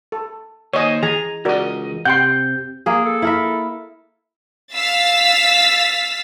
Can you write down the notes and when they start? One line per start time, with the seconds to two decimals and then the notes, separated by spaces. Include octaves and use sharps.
0.12 A4
0.73 D#2 C5 C#5 D#5 G#5
1.03 E3 G#4 G#5 A#5
1.45 C#2 F#4 A#4 D5 D#5
2.05 C3 F#5 G5 C6 G6
2.86 A#3 G#4
3.05 A4
3.22 E4 A#4 E5
4.74 F5 E6 A6 B6